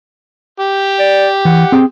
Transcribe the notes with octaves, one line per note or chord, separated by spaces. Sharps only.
G4
D5
E3 F#5
C4 G#4 G5